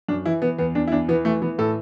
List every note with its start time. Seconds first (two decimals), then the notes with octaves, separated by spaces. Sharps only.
0.08 F#2 D4
0.26 E3 E4
0.42 E3 B3
0.58 E2 B3
0.75 E2 D4
0.87 E4
0.92 E2 D4
1.08 E3 B3
1.25 E3 A3
1.42 E3 B3
1.58 A2 A4